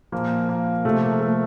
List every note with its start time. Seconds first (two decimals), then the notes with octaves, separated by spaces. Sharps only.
0.12 A#2 F3 A#3
0.49 A#3
0.85 C3 F3 A3
1.03 A#3
1.21 A3